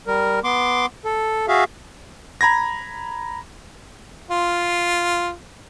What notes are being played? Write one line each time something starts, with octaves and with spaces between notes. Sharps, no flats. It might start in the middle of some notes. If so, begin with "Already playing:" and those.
G3 A#4
B3 C6 D6
A4
F#4 G#4 E5 F5
A#5 B5 G#6 A#6
F4